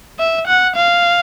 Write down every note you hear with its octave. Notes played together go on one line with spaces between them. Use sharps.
E5
F#5
F5